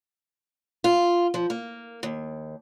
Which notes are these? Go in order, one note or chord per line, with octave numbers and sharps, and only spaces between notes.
F4
F3
A#3
D#2